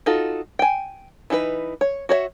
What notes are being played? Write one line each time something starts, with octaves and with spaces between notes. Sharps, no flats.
D#4 F4 F#4 A4
G5 G#5
E3 D#4 F#4 B4
C#5
F#4 C#5 D5 E5